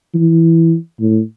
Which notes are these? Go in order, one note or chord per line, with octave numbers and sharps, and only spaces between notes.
E3
A2